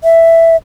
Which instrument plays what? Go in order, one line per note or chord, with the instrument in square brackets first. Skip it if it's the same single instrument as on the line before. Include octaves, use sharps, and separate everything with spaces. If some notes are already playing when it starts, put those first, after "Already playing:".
[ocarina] E5